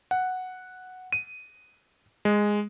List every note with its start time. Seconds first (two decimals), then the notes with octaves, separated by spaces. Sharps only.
0.11 F#5
1.12 D#7
2.25 G#3